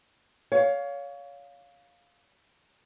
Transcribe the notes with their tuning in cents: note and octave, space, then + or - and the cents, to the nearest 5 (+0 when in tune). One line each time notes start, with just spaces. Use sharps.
C#5 +25 F5 +10